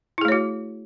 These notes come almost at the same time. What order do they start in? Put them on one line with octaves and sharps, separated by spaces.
E4 G#4 A3 C#5 F#4